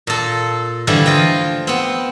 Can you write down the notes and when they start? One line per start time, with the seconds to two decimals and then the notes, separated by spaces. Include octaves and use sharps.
0.07 A#2 A4
0.87 D3 E3 F3 G3 A3
1.06 F4 D#5 G5
1.67 B3 C4